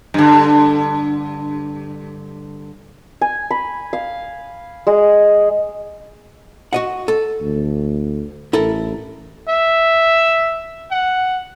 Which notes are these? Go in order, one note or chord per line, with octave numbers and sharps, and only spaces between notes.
G2 D3
G#5
B5
F5
G#3
F#4 D#5 F#5
A4
D2
A1 E4 A4 A#4
E5
F#5